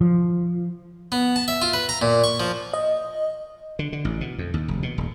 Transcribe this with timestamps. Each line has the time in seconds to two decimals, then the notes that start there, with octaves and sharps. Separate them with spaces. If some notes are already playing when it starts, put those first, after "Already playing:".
0.01 F3
1.12 B3
1.36 A5
1.48 E5
1.62 F4
1.73 B4
1.89 A#5
2.02 A#2
2.24 C#6
2.40 F3
2.73 D#5
3.79 D3
3.93 D3
4.05 A1
4.21 B2
4.38 F2
4.54 D#2
4.68 F1
4.83 B2
4.98 D#1